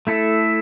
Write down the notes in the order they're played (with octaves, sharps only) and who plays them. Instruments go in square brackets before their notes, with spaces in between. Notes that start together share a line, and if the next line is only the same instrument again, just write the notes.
[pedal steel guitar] A3 E4 A4